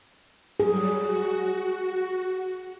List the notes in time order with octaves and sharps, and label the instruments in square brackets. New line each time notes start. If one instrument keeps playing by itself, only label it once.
[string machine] F#3 G3 [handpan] G#4
[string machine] F#4